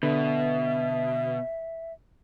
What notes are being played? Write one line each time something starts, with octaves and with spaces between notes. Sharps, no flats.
B2 D3 B4 E5